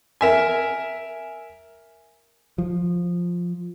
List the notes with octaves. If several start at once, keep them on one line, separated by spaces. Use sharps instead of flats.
A#4 E5 G#5
F3